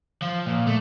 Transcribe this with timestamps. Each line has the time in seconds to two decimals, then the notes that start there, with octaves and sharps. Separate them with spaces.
0.22 F3
0.46 A#2
0.67 A3